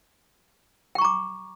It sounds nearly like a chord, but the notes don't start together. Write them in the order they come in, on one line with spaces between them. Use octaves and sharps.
G5 C#6 A#5 D6